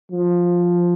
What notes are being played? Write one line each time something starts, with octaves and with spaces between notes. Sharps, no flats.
F3